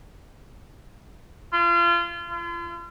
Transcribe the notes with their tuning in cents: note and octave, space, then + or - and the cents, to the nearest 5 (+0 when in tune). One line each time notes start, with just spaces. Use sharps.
F4 -30
F4 -40